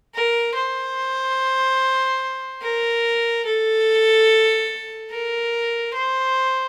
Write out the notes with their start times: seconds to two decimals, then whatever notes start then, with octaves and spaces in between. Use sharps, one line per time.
0.15 A#4
0.55 C5
2.62 A#4
3.45 A4
5.12 A#4
5.94 C5